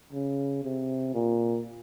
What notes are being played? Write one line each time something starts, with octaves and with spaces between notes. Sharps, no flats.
C#3
C3
A#2